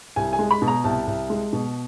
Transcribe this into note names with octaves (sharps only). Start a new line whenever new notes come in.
C2 G#5
G#5
G#3
B5
B2
A#5
C2 A5
C2
G#3
B2